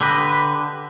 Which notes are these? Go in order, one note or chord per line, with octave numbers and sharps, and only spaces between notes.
D3 G4 B4 D#5